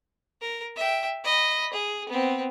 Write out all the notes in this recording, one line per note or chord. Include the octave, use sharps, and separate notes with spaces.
A#4
E5 G5
D#5 B5
G#4
B3 C4